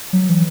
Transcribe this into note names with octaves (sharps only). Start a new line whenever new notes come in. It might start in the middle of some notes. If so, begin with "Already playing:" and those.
F#3
E3